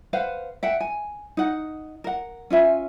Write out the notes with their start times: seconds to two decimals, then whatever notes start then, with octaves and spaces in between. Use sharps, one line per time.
0.13 B4 C5 F5 F#5
0.63 E5 F#5 G5
0.80 G#5
1.37 D#4 F#5
2.04 A#4 F#5
2.50 C#4 F4 E5 G#5